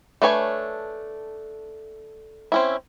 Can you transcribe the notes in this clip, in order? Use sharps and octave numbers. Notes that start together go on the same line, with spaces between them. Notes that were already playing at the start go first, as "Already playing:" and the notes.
A3 D4 B4 C#5 G#5
C4 C#4 E4